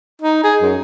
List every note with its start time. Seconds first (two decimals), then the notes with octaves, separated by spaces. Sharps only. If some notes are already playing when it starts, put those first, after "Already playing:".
0.22 D#4
0.44 G#4
0.61 F#2